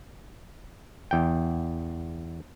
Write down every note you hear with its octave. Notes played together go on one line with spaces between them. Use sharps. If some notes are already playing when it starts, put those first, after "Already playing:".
E2 G5